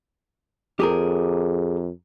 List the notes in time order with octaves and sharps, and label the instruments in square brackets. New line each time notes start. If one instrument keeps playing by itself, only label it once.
[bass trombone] F2 [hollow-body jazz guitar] G4 G#4 A#4